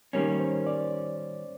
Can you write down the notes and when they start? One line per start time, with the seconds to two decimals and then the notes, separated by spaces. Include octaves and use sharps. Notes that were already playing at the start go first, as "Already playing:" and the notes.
0.13 D#3 G3 A#3 C#4 C#5
0.40 C5
0.67 D5